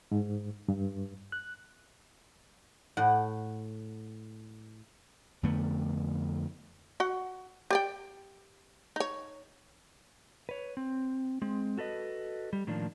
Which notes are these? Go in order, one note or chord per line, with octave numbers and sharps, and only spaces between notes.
G#2
G2
F#6
A2 F#5
F2 D3 A3 B3
F#4 F#5
G4 D5 G5
D#4 C#5
B4 C#5
C4
G#3 C4
F#4 A4 B4 D#5
G3
A2 D#3 F3 A#3 D4